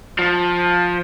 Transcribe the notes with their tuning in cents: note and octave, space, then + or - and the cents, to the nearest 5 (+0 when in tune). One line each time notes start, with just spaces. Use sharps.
F3 +15